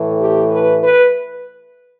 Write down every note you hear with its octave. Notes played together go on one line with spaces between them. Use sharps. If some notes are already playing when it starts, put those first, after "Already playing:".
Already playing: A2 E3 A3
G4
B4
B4